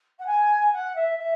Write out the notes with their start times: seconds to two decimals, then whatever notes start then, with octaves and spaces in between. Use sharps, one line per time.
0.18 F#5
0.26 G#5
0.72 F#5
0.95 E5
1.18 E5